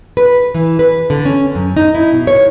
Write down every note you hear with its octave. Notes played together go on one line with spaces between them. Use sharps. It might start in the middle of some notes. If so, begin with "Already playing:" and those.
B4
E3
B4
D3
C#4
F#2
D#4
E4
B2
C#5